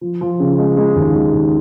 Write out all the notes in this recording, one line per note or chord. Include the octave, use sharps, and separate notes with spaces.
F3
F3
C#3
G#3
G#3
D#2
G#3
D#2